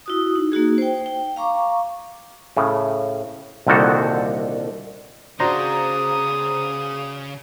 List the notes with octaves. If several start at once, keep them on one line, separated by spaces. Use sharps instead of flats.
E4 F#4 D#6
D#4
A#3 D#4 F#4 G#4
C5 G5
G5
F5 A#5 C#6 D6
A2 C#3
C2 A#2 D3 D#3 F#4 A4
C#3 D4 F#4 G#4 C5 A#5 C6 D#6